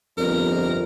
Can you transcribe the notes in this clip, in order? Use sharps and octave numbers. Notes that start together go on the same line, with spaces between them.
G1 F2 A#4